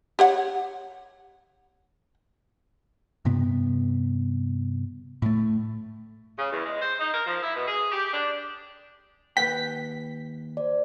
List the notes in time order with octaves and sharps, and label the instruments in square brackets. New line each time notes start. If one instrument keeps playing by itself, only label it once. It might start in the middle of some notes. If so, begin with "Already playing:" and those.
[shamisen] G4 C#5 F#5
[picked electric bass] G2 C3 B3
A2 A3
[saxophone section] C#3
E2
G#3
C5
D#4
A#4
F3
E4
B2
G#4
G4
D4
[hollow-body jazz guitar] D#2 B4 G5 [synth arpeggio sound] B6
[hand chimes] C5 D5